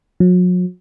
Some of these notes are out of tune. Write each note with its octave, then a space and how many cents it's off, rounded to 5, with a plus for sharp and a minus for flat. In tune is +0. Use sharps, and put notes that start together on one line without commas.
F#3 -40